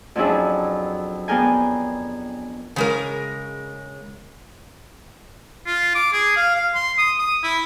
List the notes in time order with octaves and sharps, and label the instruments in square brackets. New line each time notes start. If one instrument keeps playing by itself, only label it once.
[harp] F2 F#3 C#4 D4 E4 G#4
B3 D4 G#4 A#4 G5 G#5
[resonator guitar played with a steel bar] C#3 G#3 A#4
[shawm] F4
D6
G#4
F5
F5
C6
D#6
D#6
E4